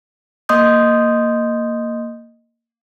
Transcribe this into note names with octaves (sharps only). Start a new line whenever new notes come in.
A#3 D#5 C6 D#6 G6